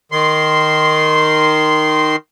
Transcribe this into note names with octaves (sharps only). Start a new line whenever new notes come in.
D#3 C6